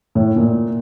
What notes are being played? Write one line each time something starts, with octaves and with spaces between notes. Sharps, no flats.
A2
A#2